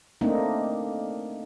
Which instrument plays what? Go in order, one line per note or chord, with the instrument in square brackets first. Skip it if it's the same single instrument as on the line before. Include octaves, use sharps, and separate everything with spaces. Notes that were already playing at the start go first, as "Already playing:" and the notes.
[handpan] A3 A#3 C4 D4 D#4